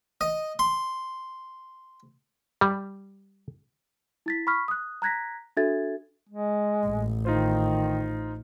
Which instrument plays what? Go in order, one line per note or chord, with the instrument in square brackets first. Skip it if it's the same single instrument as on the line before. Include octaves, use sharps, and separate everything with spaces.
[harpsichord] D#5
C6
[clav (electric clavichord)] G3
[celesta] E4 A6 B6
B5 C#6 F6 B6
D#6 F#6
A#5 F#6 G#6 A#6 B6
D4 F#4 A4 E5 G#6 A6
[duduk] G#3
[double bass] A1
[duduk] D#3 [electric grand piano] D#4 F4 C5